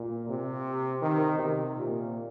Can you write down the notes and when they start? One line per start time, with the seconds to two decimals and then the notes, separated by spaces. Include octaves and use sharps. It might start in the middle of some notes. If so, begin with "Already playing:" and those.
Already playing: A#2
0.29 C3
1.02 D#3
1.39 C3
1.76 A#2